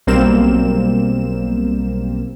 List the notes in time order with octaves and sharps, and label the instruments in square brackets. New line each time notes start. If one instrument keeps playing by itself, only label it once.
[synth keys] B1 G3 A#3 C4 E7